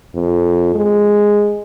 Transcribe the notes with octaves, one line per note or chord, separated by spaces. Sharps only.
F2
G#3